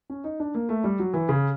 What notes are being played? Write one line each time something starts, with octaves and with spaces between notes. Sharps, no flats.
C#4
D#4
D4
A#3
A3
G3
F#3
E3
C#3